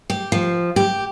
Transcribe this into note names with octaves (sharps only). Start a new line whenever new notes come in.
G4
F3
G4